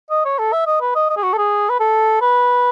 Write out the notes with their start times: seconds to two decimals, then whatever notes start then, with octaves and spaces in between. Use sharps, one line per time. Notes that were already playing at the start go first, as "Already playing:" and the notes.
0.10 D#5
0.25 C#5
0.38 A4
0.52 E5
0.66 D#5
0.81 B4
0.95 D#5
1.09 D#5
1.16 G#4
1.23 F#4
1.33 A4
1.38 G#4
1.69 B4
1.80 A4
2.21 B4